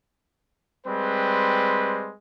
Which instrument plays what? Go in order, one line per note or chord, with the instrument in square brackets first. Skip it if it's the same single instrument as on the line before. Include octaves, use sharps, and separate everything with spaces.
[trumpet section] G3 G#3 C4 B4